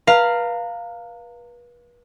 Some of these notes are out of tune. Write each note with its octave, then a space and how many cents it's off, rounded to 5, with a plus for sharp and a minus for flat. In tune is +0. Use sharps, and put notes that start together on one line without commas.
B4 -35 F5 +0 A#5 -25